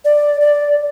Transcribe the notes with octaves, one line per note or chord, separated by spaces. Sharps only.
D5
D5